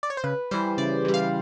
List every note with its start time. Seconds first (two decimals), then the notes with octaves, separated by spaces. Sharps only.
0.03 D5
0.10 C#5
0.17 C5
0.24 C#3 B4
0.51 E3 G3 C5
0.78 C#3 D5
1.05 E3 G3
1.14 F5